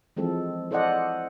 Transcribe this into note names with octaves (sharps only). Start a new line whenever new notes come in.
E3 F3 G#3 C4 A4
E4 A4 C5 D5 D#5 F#5